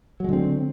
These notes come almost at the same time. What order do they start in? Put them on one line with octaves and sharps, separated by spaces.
F#3 G#3 D3 C4